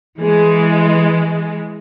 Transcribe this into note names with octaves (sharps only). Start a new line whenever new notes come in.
E3 G#3